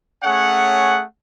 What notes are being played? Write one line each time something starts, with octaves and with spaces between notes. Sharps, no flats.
A3 C#4 G#4 C#5 F#5